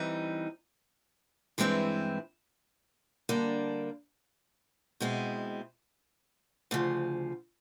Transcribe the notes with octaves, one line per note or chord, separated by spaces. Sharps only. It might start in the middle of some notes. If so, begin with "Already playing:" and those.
Already playing: E3 G3 C4 D#4
G2 E3 G#3 C4 E4
D3 G3 A#3 D4
B2 G#3 C4 E4
D2 C#3 F3